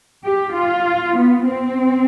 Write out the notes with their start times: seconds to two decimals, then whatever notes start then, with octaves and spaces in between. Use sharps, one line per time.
0.25 G4
0.55 F4
1.17 B3
1.48 C4